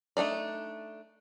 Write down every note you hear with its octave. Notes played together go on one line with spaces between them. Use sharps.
A3 D4 D#4 D5